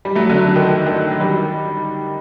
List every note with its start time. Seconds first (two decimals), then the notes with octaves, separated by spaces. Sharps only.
0.05 G3
0.15 F#3 A3
0.29 D3 F#3
0.56 D#3
0.69 D#3
0.86 D#3
1.10 F#3
1.20 D#3 G3